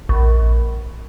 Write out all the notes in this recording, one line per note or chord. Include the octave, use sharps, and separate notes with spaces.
A#1